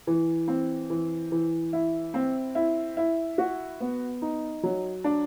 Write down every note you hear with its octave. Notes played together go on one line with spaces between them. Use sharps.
E3
C4
E3
E3
E4
C4
E4
E4
F#4
B3
D#4
F#3
D4